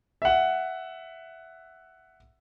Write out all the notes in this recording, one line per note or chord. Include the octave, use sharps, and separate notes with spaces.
E5 F#5